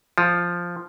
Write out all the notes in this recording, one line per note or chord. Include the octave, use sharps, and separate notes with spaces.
F3